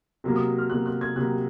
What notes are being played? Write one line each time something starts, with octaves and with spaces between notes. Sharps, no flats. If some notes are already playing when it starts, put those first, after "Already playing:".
C3 F#3 A#3
D#6
F6
C3 F#3 A#3 F#6
F#6
G#6
C3 F#3 A#3 F#6